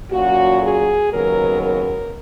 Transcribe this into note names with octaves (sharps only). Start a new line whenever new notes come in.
A#2 F#3 C#4 F#4
G#4
D#2 C#3 F#3 B3 A#4
A#4